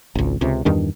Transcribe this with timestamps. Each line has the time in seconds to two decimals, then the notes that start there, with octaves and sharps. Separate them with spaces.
0.15 G#1 C#2
0.41 C#2 C3
0.65 E2 G2 D#3 D4